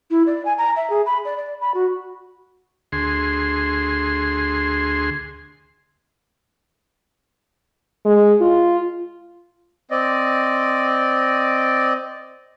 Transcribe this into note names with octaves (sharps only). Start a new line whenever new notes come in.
E4
D5
G#5
A#5
E5
G#4
B5
D5
D5
B5
F#4
D2 G#4 C6
G#3
F4
C4 D5 D#5